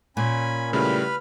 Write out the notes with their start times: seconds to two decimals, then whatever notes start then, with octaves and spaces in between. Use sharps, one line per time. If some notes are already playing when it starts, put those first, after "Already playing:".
0.17 A#2 C#4 G#5 B5
0.73 C#3 G3 A3 E4 B4 B5 F6